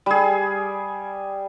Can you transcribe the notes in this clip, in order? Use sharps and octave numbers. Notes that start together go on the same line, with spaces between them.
G3 G#4